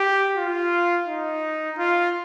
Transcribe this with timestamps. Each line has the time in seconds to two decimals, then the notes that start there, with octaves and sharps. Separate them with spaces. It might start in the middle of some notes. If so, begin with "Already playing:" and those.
Already playing: G4
0.36 F4
1.07 D#4
1.78 F4